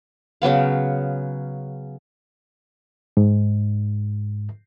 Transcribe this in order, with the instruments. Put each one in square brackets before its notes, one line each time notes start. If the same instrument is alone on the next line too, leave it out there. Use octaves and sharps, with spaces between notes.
[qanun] C#3 F#3 B3 F5
[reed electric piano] G#2